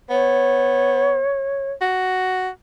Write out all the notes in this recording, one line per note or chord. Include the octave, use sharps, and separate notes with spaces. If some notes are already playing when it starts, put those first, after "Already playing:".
B3 C#5
F#4